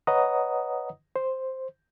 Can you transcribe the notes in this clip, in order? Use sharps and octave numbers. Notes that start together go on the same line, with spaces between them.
B4 C#5 D#5 F#5 A#5 D#6
C5